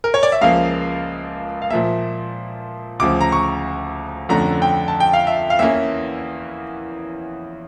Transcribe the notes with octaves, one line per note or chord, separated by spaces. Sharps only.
A#4
C#5
D5
E5
C#2 C#3 F3 A#3 F5
F5
A#2 F3 A#3 E5
D2 C#3 F3 D6
A#5
C#6
F2 D3 A3 C#4 A#5
G5
A5
G5
F5
E5
F5
E2 E3 A#3 C#4 E5